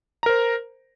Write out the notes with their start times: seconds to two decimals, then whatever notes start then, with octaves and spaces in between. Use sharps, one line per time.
0.23 A#5
0.26 A#4
0.29 C5